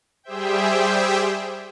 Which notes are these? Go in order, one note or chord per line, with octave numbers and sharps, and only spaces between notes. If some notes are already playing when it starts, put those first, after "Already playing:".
G3 G4 G#4 C5 E5 G5